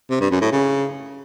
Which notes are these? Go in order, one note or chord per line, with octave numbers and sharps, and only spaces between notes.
C3
G2
F#2
A2
C#3